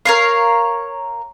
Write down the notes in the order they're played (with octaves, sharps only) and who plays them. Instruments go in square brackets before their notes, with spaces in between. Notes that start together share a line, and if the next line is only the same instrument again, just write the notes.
[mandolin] A#4 C#5 F5